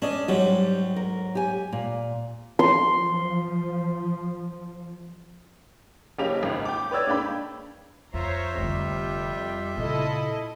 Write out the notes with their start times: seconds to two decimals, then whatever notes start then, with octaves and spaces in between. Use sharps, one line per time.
0.02 C#4 D4 D#5
0.28 G#2 F#3 G3 G4
0.96 A#4
1.35 G4 G#5
1.73 A#2
2.59 F3 C6
6.19 F#1 A#3 C#4 G4 F7
6.43 G#1 C#2
6.65 G5 D6
6.91 B4 C#5 D5 E6 G#6
7.07 G#2 A#3 D4 G5 B5
8.14 F2 F4 C5 C#5 E5 A#5
8.58 F1 F2 D3 G3
9.77 A#2 C#3 E4 A4 D#5